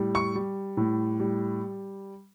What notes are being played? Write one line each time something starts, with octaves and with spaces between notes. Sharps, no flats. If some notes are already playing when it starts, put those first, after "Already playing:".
Already playing: A2 G3
C#6
G3
A2
G3